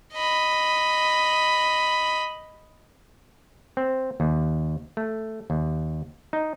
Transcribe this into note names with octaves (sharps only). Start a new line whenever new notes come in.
D#5 B5
C4
D#2
A3
D#2
D#4